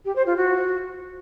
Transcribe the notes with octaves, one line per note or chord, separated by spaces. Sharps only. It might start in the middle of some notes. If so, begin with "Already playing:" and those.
G4
C5
F4
F#4